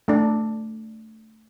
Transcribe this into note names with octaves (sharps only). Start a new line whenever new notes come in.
A3 D4